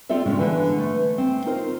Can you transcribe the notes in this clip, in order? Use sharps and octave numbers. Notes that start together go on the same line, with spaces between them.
C4 F4 A4 D5 E5
A2 C#3 G#3 C#4 D4
D3 E3 B3 B4 G#5
A3
C4
D#4 F4 A#4 C5